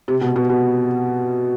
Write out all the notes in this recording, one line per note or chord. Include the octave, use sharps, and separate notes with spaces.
C3
B2
B2
B2